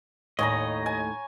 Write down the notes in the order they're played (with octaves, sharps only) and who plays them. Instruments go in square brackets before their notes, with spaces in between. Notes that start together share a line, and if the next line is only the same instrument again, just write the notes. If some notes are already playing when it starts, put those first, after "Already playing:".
[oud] D#2 A2 [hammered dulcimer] C#5 G#5 A#5 [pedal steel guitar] D#5
[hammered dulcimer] G#5